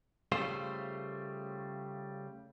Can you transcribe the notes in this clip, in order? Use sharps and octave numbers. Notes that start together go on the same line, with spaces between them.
C#3 G3 A3 F4 C5